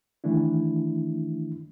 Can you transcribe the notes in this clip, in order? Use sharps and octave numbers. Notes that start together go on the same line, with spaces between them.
D#3 E3 A3 D4 E4